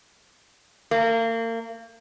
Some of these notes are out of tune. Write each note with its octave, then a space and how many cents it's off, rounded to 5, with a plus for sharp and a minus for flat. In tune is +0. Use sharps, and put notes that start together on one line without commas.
A#3 -35